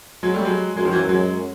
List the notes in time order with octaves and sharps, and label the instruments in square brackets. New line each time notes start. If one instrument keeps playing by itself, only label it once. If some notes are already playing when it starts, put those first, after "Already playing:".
[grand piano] F#3 G#3
G3 A3
F#3 G#3
[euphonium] F#2 [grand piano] F#3 G#3
[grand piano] D#3 F3
E3 F#3
F#3 G#3